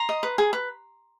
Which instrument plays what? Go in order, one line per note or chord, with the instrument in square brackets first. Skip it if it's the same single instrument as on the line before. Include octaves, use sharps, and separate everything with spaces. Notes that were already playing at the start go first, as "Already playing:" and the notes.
Already playing: [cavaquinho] A#5 C6
D#5
B4
G#4
B4